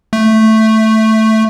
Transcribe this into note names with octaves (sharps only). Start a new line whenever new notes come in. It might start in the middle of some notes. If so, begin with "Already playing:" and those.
A3